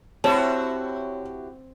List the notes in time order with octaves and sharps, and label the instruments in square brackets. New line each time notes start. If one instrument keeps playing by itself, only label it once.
[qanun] C4 [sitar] E4 F#4 G4 [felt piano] C#5 [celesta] A5